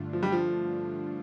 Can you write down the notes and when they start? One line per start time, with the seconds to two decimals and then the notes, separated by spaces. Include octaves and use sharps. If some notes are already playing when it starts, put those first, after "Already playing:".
Already playing: G2 D3 A3 D4 F4
0.13 F3
0.23 G3
0.32 F3